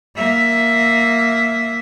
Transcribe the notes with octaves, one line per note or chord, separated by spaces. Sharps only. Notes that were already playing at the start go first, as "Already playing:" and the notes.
A#3 E5